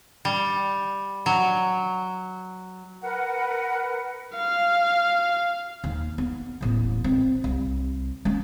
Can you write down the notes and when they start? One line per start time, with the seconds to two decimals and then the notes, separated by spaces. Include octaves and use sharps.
0.25 G3
1.26 F#3
3.01 A#4 B4 F#5
4.36 F5
5.84 D#2
6.18 B3
6.61 D#1 A1
7.04 C4
7.44 C2
8.25 A#3 C#4